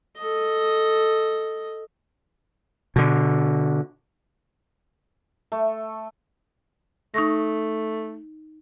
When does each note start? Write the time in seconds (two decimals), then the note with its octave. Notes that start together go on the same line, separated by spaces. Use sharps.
0.17 A4 D#5
2.96 B2 D3
5.52 A3
7.14 A3 D#4 C#6 A#6